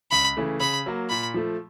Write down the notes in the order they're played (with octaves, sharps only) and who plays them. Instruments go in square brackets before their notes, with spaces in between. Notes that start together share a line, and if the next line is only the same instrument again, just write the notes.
[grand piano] C#2 [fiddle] B5
[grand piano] C#3 E3 A3
[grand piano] C#3 [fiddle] B5
[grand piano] F#3 A#3
[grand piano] A#2 [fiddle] B5
[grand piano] F3 A3